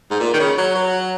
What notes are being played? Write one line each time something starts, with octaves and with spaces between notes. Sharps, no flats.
G#2
A#2
D#3
C#3
F#3
F#3